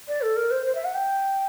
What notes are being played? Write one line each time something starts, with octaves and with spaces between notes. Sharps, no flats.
D5
A4
A#4
C5
C5
E5
F#5
G5